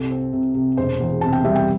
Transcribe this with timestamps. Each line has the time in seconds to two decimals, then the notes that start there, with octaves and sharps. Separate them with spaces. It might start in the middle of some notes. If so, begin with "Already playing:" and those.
Already playing: C2 A4
0.11 C4
0.33 C3
0.55 C3
0.77 E1 C5
1.00 E2
1.21 C3 A5
1.33 G5
1.44 G3 E5
1.56 G5